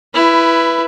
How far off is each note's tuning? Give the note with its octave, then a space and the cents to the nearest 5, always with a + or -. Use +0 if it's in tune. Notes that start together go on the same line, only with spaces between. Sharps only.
E4 +15 B4 +0